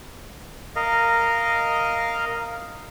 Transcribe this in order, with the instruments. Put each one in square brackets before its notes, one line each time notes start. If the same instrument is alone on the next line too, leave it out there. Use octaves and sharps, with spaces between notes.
[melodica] A#4 D#5 F5